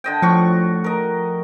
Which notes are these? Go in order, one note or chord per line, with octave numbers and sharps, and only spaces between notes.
D3 D#5 G5
A2 F3 F#4 C#6
A#4 D#5